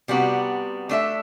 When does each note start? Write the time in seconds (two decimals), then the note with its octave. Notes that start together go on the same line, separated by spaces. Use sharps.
0.08 C3 G3 B3 D4 F#4
0.89 A3 D4 A4 E5